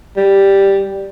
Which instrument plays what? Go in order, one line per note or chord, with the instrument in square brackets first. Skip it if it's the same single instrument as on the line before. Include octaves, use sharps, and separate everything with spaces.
[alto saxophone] G3